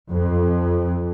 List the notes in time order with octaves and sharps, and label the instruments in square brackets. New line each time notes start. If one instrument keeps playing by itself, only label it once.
[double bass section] F2